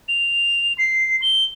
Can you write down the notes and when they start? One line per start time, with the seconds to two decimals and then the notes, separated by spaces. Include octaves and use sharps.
0.08 F7
0.78 C7
1.22 G7